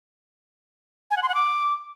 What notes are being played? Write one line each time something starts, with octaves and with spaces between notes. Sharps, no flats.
G#5
F#5
C6
F#5
D6